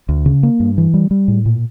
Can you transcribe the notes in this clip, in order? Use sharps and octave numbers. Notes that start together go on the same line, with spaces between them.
D2
C#3
A#3
G2
E3
G3
G3
A2
A#2